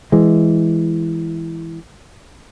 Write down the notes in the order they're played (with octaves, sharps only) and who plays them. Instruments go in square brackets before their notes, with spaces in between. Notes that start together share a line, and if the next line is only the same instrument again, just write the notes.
[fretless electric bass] E3 G#3